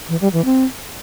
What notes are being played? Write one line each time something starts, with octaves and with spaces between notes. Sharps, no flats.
E3
G3
E3
C4